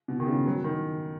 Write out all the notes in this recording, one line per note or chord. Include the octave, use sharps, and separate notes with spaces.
B2
D#3
C#3
F#3
D#3